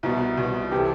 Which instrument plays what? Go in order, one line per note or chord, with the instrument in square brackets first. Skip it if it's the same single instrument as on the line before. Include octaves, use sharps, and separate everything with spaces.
[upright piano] C2 B2 B3 [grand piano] E4
[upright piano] C2 B2 B3
[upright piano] C3 E3 [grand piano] G4
[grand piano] A4